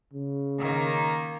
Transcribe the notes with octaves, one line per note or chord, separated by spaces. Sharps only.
C#3
D#3 A#3